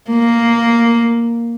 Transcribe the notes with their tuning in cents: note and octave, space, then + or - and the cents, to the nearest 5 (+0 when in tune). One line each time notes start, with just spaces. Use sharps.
A#3 +0